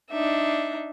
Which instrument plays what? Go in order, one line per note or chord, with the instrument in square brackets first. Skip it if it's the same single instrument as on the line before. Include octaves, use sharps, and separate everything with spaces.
[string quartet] D4 D#4 E5